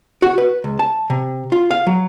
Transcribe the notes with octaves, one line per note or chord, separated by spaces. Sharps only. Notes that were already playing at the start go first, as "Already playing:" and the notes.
F#4
B4
C#2
A5
C3
F4
F5
F#3